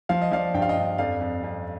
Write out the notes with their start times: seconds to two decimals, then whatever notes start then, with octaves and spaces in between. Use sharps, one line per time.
0.09 F3 F5
0.22 D#5
0.31 F3 D5 F5
0.54 G2 G5
0.62 F5
0.69 D#5 G5
0.77 G2
0.98 F2 D5 F5
1.21 F2
1.43 F2